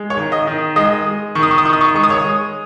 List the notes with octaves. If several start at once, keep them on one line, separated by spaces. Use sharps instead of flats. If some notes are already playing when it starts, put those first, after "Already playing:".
Already playing: G#3
C#5 C#6
D#3
D#5 D#6
D#3
G#3 D#5 D#6
G#3
D#3 C#6
D#6
C#6
D#6
D#3 C#6
D#6
C#6
D#6
G#3 C#6
D#6
C#5 C#6
G#3